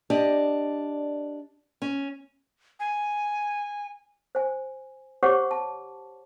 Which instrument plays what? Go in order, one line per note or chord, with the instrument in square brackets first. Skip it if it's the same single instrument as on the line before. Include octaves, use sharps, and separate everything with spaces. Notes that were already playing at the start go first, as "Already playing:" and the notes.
[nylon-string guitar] D4 G4 D5 D#5
C#4
[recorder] G#5
[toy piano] C5 G#5
G4 C5 C#5 F#5 C#6 D6
A5